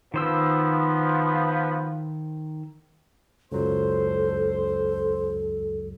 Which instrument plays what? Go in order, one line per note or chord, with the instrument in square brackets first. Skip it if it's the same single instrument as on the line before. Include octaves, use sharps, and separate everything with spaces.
[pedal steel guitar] D#3 C5 E6 [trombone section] F3 B3
[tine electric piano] C#2 F#2 F#3 [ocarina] A4 [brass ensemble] C5